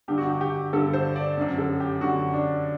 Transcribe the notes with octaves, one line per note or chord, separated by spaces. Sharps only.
G2 D3 G4
F#4
G4
G4
G2 D3 A4
C5
D5
F#2 D3
A4
G4
F#2 D3 F#4
D4